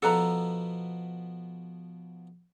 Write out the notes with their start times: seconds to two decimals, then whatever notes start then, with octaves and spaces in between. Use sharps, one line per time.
0.02 B2 F3 B3 A4 B4 A#5